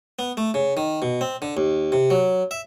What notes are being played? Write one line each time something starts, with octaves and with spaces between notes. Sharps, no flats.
B3
A3
C#3
D#3
B2
C4
D3
D#2
C3
F#3
E5